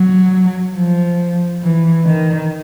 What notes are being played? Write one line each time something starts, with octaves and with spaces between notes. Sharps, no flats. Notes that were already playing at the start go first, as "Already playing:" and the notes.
Already playing: F#3
F3
E3
D#3